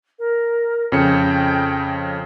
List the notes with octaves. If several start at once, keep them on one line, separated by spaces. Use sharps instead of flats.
A#4
F2 C#3 G5 C#7